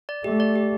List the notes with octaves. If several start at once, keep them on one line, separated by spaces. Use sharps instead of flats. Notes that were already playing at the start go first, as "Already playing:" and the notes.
D5
A3 G4
D5
G4